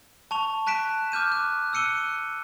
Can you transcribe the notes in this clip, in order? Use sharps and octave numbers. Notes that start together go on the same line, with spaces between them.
A5 C#6 F7
A5 F#6 B6 D7 E7
D6 F6 G6 D#7
F#6
E6 F#6 C#7 D#7 G7